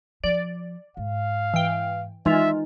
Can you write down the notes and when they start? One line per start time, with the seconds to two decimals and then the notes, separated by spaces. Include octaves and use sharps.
0.24 F3 D5
0.97 G#2 F5
1.54 E3 G5
2.26 E3 G#3 D#4 F4 E5